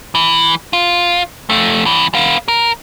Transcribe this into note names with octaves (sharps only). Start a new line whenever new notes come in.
E3
F4
F2 A3
C2 E3
B3 F5
A#4